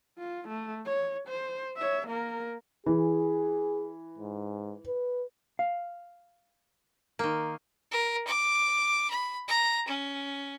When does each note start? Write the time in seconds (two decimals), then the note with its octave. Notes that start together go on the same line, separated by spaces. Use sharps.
0.18 F4
0.48 A3
0.85 C#5
1.28 C5
1.76 C#5 E5
2.08 A#3 A#4
2.86 E3 G#4
4.18 G#2
4.87 B4
5.59 F5
7.19 D#3 A#3
7.92 A#4
8.27 D6
9.10 B5
9.48 A#5
9.88 C#4